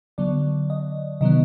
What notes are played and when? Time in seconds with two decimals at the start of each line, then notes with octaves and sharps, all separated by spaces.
0.18 D3 F#3 B3 D5
0.70 D#5
1.21 C3 D#3 F#3 B3 D#5